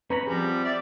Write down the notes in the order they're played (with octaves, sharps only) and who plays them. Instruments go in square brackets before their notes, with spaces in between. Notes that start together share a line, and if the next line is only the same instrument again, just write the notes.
[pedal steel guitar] C#4 C#5 B5 [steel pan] B4 A#5
[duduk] F3 [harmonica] G3 [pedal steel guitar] C4 F#5 [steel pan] G#4 A#5
[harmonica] D5 E5